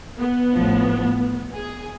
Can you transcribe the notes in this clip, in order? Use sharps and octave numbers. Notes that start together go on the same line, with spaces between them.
B3
A1 A2 F3
G#4